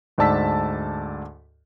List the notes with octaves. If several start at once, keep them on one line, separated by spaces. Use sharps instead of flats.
D2 G#2 D5 A5 E6 B6